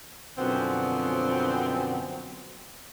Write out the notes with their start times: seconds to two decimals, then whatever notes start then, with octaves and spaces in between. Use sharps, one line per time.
0.38 F#2 B2 D3 F3 B3 C4